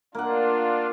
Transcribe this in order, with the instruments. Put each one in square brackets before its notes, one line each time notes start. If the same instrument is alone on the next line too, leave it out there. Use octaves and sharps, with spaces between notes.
[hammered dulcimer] A#3 F#5 [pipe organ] D4 F4